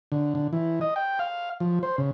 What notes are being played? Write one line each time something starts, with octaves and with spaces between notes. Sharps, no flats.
D3
D3
E3
D#5
G5
F5
F3
C5
C#3